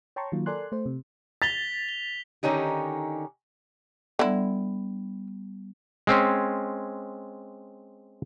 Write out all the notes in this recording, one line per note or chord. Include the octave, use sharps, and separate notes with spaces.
C#5 G5 A5 A#5 C6 C#6
D#3 F#3 A#3 F4
A4 A#4 D5 G#5 C6 F#6
A3 C5
C3
A6 B6 F7 G7
G7
D3 D#3 C#4 D#4 G4
D3 G3 B3 E4
G#3 C4 C#4